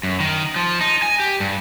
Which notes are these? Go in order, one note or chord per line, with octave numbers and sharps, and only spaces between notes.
F#2
D#3
F3
D#4
G#5
G4
G2